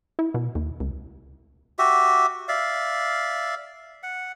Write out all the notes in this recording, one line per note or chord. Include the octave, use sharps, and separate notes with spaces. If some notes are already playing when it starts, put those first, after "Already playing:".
E4
B2
D#2
C#2
F#4 G4 E5
D5 E5 F5
F#5